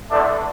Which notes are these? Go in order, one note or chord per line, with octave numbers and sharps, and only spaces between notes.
E2 D3 A3 D4